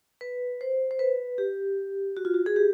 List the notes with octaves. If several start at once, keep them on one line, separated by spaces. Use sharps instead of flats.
B4
C5
C5
B4
G4
F#4
F4
F#4
G#4
G4